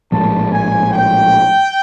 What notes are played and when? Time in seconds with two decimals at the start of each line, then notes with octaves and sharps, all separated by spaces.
0.12 A#1 A2 F3 G#3 A5
0.52 G#5
0.91 G5